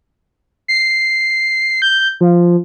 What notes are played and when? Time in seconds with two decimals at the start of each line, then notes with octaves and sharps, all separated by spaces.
0.68 C7
1.82 G6
2.21 F3